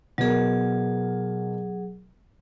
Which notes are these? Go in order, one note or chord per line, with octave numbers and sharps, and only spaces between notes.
B2 F#3 G#4 A#4